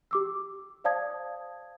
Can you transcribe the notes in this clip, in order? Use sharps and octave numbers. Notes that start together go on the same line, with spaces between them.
G4 D6 E6
C5 D5 F5 A5 D#6 G#6